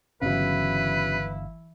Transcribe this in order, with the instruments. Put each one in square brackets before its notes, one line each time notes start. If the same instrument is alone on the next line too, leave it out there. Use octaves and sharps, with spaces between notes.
[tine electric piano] G1 F5 [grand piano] C#3 F#3 [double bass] E3 E4 [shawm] B4